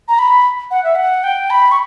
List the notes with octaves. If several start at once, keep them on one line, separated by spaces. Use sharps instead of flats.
A#5
B5
F#5
E5
F#5
G5
B5
C#6